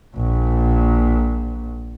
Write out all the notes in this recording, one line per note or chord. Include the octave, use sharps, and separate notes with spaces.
A#1 A#2